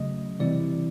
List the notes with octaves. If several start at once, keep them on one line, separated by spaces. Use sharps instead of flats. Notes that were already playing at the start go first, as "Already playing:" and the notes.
Already playing: C#3 F#3 A3 D#5
C3 E3 G3 C4 E4 D5